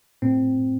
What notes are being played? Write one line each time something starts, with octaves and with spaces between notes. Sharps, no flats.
A2 C4